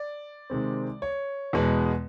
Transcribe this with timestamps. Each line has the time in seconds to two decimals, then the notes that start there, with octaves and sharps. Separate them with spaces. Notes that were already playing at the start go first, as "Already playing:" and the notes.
Already playing: D5
0.50 C3 D#3 G#3 C4
1.02 C#5
1.53 E2 B2 G#3 B3